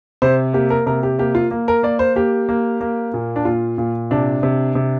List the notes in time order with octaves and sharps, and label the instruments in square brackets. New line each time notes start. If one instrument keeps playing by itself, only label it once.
[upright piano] C3 C5
A#3 G4
A#4
C3 A#4
G4
A#3 G4
F4
A#3
A#4
A#3 D5
C5
A#3 G4
A#3
A#3
A#2
D4
A#2 F4
A#2
C3 D4
C3
C3